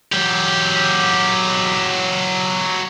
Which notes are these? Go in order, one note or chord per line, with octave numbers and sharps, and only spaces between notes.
F#3 G4